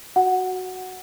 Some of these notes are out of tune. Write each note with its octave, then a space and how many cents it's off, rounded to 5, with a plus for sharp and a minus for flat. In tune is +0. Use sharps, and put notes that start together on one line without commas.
F#4 +0 F#5 +0